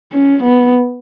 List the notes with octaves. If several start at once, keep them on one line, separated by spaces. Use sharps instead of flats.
C#4
B3